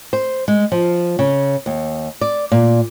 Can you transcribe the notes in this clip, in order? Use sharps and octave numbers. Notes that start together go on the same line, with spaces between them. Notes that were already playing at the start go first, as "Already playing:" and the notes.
C5
G#3
F3
C#3
D#2
D5
A#2